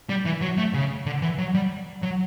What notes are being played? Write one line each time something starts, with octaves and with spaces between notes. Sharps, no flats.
G3
E3
F#3
A3
C#3
D3
E3
F#3
G3
F#3